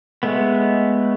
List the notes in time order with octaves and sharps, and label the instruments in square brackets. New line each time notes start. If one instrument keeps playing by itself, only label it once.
[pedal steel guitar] G#3 A3 B3